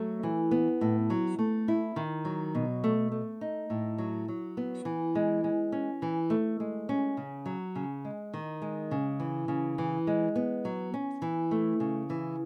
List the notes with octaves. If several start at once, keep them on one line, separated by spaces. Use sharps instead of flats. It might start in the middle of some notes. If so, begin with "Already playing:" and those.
Already playing: F#3 A3
E3
B3
A2
F#3
A3
E4
D#3
F#3
B2
A3
A3
D#4
A2
F#3
F#3
B3
E3
G#3
G#3
C#4
E3
A3
G#3
C#4
C#3
F#3
C#3
G#3
D#3
G#3
C#3
E3
C#3
E3
G#3
B3
F#3
C#4
E3
A3
C#3
E3